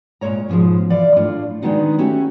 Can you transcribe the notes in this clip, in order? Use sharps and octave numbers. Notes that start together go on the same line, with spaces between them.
A#2 G#3 A#3 C#5 A#5
G#2 B2 D#3 F3 G#3
E3 D5 F5
A2 D4 F4
D#3 G#3 B3 D4 D#4 F#4
A3 C#4 E4 F#4 G4